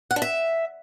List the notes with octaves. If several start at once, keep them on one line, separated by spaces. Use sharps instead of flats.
F#5
D4
E5